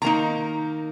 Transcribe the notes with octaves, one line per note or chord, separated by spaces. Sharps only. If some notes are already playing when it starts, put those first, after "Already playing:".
D#3 A#3 D#4 A#5